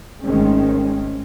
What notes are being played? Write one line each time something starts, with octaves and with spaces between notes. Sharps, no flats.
G#1 D#3 G#3 A3 C4 C#4